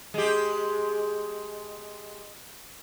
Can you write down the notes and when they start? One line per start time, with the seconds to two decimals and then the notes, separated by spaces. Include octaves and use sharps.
0.14 G#3 G4